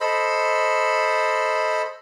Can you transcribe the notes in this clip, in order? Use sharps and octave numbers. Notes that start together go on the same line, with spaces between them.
A4 C5 D#5 B5